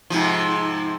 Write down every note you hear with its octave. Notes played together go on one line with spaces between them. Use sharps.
G#2 C3 F3